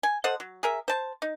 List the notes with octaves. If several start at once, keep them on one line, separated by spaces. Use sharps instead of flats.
G#5
A4 C5 D#5 F#5
F#3
G#4 A#4 E5
C5 A5
D#4